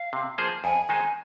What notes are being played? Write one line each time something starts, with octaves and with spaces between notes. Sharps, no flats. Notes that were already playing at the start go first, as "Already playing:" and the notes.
Already playing: F5
C3
F3 A#3 G#4 C5
F2 G#5
D#3 G#3 D#4 C5 G#5